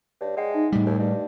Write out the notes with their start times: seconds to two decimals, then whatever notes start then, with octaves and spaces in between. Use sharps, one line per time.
0.21 G2 C#5
0.37 G#3 D5 F#5 G5
0.50 D#4 E5
0.72 A2 G3
0.86 D#2
0.99 G2